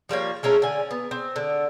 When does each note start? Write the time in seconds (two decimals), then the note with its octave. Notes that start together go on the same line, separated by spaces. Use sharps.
0.09 F3 G3 A#3 C#5
0.43 G#3 A3 C#4 A#4
0.62 D3 G#5
0.91 B3
1.11 C4
1.36 D3